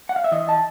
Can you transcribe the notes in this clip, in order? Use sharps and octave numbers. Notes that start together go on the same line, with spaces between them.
F#5
F5
E5
E3 D#5
A5